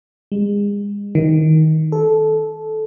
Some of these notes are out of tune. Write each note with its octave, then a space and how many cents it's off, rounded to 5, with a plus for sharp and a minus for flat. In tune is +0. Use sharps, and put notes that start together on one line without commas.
G#3 -35
D#3 +15
A4 -15